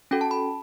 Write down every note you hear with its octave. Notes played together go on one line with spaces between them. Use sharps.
C#4 F#4 A4 G5
A5
B5